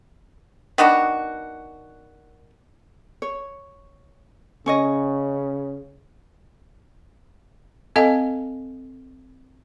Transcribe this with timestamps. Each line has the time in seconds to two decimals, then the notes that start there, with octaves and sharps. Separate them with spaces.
0.78 D#3 B3 D4 F#4
3.22 C#5
4.66 C#3 C#4 C#5 D#5
7.96 C4 A4 D#5 F5 A5